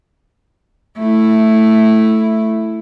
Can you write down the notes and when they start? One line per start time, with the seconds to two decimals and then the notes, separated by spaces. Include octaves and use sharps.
0.98 A3 E4